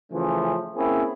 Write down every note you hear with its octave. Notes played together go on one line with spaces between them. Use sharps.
C#3 E3 F3 A3 C#4
A#3 C4 C#4 E4 G#4